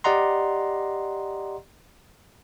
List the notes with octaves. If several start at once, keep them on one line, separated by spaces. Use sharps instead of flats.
G4 D5 D#5 F#5 A#5 C6